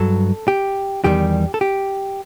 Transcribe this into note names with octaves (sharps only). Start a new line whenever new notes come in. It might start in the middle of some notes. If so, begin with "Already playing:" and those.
Already playing: G2 F#3 A4
G4
E2 D#3 G3 G4
A4
G4